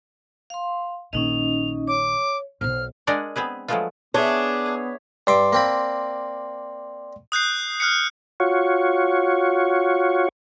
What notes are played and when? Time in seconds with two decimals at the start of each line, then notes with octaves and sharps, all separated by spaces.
0.50 F5 C6
1.13 A#1 D#3 C#4 D#4 D#5 F7
1.87 C#5 D6
2.61 B1 B2 C5 F6
3.07 G#3 D4 A#4 D5 F#5 G#5
3.36 B3 C4 G#4 B4
3.68 F3 F#3 G#3 A3 B3 F4
4.14 B3 D4 G#4 C#5 E5
5.27 G2 D5 E5 C6 D6
5.53 A#3 C4 B5
7.32 D#6 F#6 G6 C7
7.80 F6 F#6 C7 C#7
8.40 F4 F#4 C#5